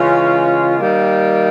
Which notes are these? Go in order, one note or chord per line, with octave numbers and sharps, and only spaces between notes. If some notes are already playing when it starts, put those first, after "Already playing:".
Already playing: C#3 E3 G#3 C#4 F4
D#3 G3 A#3